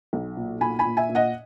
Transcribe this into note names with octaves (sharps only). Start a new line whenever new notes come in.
B1
A#2
A#2 G#5 B5
G#5 B5
A#2
E5 G#5
A#2
D#5 F#5